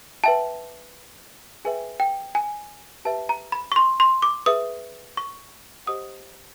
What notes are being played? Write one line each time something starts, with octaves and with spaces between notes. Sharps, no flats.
B4 E5 G5 A5
G#4 B4 E5 G5 G#5
G5
G#5
G4 B4 E5 A5
A#5
B5
C#6
C6
C6
D6
G#4 B4 E5 D#6
C#6
G4 C5 D#5 F#5 D#6